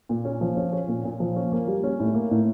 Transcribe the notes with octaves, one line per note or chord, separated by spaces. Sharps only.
A#2
C#4
F3
C#4
C#4
A#2
A#2
F3
C#4
A#3
G3
C#4
A2
A#3
A2